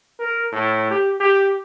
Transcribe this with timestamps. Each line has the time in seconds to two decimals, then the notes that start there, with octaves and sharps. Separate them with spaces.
0.20 A#4
0.52 A2
0.91 G4
1.20 G4